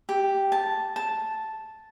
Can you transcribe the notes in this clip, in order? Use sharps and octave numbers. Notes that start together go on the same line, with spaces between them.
G4
A5
A5